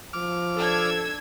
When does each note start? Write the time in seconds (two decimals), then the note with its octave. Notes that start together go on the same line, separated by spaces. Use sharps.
0.13 F3 D6 F6
0.57 D4 A4 E6 G#6